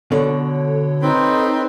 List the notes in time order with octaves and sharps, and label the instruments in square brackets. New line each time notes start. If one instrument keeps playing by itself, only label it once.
[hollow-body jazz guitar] B2 D3 [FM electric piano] A4 C#5
[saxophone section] C4 B4 [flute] D#4